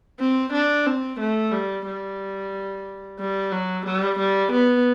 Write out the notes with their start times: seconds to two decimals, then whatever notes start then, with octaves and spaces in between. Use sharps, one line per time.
0.20 C4
0.53 D4
0.87 C4
1.20 A3
1.52 G3
1.87 G3
3.19 G3
3.52 F#3
3.86 G3
4.19 G3
4.52 B3